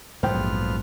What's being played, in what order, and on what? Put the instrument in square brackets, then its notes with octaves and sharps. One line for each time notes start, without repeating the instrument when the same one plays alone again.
[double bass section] A#1 [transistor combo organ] F2 B3 F6 [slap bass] G#2 F#3 [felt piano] C5 G5